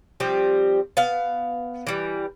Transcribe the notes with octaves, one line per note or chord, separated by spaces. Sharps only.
F3 G3 C4 G4
B3 F5
E3 G3